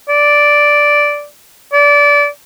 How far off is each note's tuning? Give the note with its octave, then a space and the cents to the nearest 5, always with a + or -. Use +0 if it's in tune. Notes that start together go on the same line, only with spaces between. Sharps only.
D5 -5
D5 -25